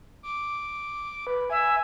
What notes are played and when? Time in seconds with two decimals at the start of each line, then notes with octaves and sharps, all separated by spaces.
0.23 D6
1.27 B4
1.50 E5 G#5